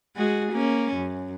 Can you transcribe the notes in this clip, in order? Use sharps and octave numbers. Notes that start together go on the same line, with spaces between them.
G#3 F#4 G#4
A#3 C#4
F#2